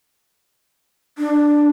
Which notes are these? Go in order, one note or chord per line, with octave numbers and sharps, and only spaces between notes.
D4